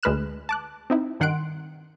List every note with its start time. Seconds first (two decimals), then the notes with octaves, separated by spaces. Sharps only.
0.03 D2 G#3 B4 F6 F#6 E7
0.49 A5 D6 F#6
0.90 C4 D#4 E4
1.20 G2 D#3 F#5 C6 F#6 D7